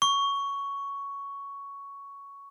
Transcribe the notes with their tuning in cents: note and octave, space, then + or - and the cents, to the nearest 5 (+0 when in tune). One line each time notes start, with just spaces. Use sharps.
C#6 +10